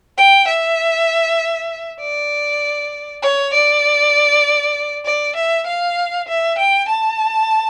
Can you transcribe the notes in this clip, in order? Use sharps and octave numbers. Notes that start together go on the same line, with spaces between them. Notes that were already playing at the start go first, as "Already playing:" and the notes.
G5
E5
D5
C#5
D5
D5
E5
F5
E5
G5
A5